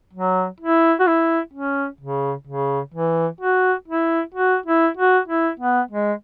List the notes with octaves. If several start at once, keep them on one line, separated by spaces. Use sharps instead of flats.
F#3
E4
F#4
E4
C#4
C#3
C#3
E3
F#4
E4
F#4
E4
F#4
E4
B3
G#3